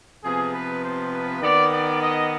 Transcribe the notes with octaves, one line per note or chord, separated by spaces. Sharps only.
C3 F3 B3 G#4
B4
C5
B4
D#3 B3 D5
D5
D#5